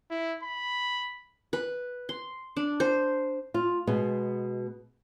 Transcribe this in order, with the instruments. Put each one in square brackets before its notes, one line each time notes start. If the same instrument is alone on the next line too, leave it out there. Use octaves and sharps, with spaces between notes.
[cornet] E4
B5
[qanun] B4
C6
D4
C5
[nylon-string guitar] F4
B2 G#3 B3